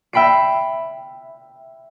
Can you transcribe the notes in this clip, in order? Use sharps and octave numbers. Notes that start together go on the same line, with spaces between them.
E5 G5 B5 C7 D7